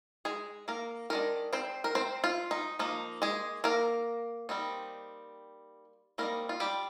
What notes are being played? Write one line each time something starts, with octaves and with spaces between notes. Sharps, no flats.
G#3 G#4
A#3 A#4
D#3 G#3 D4 A#4
C4 C5
A#4
C4 C5
F4
D#4
F3 A#3 D#4
G#3 G#4
A#3 A#4
G3 C4 D#4
G3 A#3 C4 D#4 A#4
F4
G3 G4